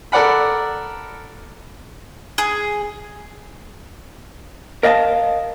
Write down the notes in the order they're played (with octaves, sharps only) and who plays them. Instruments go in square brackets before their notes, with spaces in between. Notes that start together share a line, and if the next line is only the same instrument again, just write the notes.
[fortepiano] A4 A#4 D5 F#5 B5
[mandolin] G#4
[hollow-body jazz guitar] A#4 D#5 F5 G#5 A5